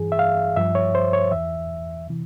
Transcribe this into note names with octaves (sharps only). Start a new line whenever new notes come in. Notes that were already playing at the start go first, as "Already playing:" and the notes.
Already playing: G2 E3 G#4
E5
F5
G2 F3 E5
C#5
C5
C#5
E2 E3 E5
C3 E3